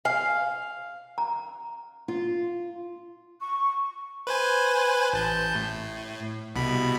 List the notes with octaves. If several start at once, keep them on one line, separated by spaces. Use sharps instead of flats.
F5 G#5
A#5
F4
C#6
B4 C5 G#5
A1 A5 G6
A2
C2 B2 B5